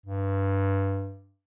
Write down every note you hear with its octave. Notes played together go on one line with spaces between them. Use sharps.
G2